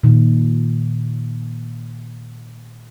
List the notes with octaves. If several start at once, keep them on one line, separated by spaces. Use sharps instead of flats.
A#2 D#3